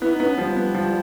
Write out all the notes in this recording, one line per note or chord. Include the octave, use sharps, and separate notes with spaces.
B3 E4
D#4
B3
C#4
F3 G3
B3
F3